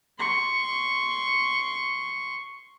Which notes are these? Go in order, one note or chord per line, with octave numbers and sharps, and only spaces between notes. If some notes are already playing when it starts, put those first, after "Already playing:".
C6 C#6